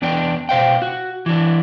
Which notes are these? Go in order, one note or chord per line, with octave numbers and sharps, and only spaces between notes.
E2 B3 D4 G5
B2 C5 F5 G5
F#4
E3 D4